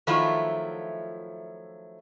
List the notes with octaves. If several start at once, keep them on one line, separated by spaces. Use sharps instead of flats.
D#3 F3 F#3 A3 E4 F4